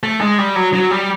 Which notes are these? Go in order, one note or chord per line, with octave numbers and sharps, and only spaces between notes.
A3
G#3
G3
F#3
F#3
G3